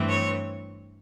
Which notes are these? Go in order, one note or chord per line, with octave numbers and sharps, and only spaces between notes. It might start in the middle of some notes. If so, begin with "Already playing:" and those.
Already playing: G2 E3 A3 C4
C#5